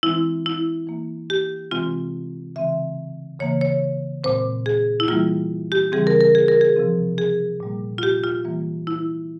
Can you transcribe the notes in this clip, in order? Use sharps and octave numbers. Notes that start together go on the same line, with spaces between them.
E3 G#3 C4 E4
E4
E3 A#3
G4
C3 E3 G#3 C4 F4
C#3 E3 G#3 C4 E5
C#3 E3 A#3 C#5
C#5
A#2 G#3 C4 C5
G#4
E4
E3 G3 A#3 F4
G4
C#3 E3 G3 C4 G#4
A#4
A#4
G#4
A#4
G#4
C3 F3 C4
G#4
A#2 G3 A#3
F4
G4
F4
E3 G3 A#3
E4